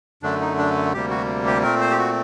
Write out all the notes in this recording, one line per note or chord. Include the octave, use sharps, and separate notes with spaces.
F#2 D3 A3 D4
D#4
D4
D2 C3 G3 A#3 G4
F#4
G4
A#2 A3 C4 A#4
C5
G4
F#4